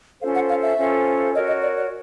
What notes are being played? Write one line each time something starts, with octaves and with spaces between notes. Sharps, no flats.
C#4 F4 A4 C5 F5
F#5
F5
E5
C#4 F4 A4 C5
F#4 A#4 C#5 D#5
D#5
D5
D5